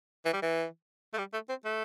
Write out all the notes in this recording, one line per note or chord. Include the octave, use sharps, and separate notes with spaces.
E3
G3
E3
A3
G3
A3
C4
A3